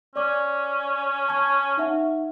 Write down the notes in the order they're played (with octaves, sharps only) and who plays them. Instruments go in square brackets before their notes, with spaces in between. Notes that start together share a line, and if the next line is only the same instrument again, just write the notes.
[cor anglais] C#4 [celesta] D5 D6
[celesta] A5 C#6 G#6
D#4 E5 F#5